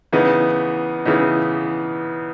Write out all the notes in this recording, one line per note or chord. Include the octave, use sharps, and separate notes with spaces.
C#3 E3 B3 D#4
C#3 E3 B3 D#4